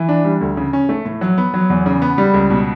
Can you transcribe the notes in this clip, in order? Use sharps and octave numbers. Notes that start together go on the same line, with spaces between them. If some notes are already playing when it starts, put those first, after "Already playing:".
Already playing: E3
D4
G3
D2
C#3
C#4
A3
A2
F#3
B3
F#3
E2
C#3
B3
G3
C#2
B2